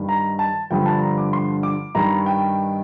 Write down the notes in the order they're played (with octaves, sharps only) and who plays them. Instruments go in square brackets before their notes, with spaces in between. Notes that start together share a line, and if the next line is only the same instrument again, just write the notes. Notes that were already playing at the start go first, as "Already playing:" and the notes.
Already playing: [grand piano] G2 D#3
A#5
A5
G2 D3 F3 G5
A5
A#5
D6
C6
D6
G2 D#3 A#5
G5